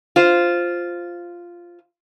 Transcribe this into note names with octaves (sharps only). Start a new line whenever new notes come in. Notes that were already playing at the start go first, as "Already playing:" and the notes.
F4 C5